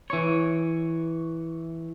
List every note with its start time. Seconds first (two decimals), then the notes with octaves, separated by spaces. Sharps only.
0.10 E3 C#5